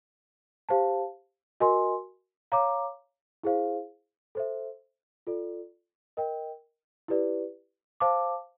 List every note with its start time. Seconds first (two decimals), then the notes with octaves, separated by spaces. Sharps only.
0.69 G4 C5 F5 A5
1.60 F#4 A#4 D#5 G#5 C6
2.52 C#5 F5 A#5 D6
3.44 E4 G#4 C5 F5
4.35 A4 C5 E5
5.27 F4 A4 D5
6.17 A#4 D#5 G5
7.08 E4 G4 B4 D5
8.00 C5 F5 A5 D6